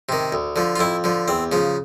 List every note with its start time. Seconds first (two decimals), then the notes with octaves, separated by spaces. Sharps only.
0.09 C3 D#3
0.33 D2
0.56 D3 F3
0.76 F4
0.79 F2 E4
1.04 D3 F3
1.28 E2 C4
1.52 C#3 F3